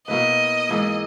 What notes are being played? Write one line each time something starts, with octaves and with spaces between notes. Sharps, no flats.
B2 A#3 E4 B4 D#5
G#2 E3 A#3 E4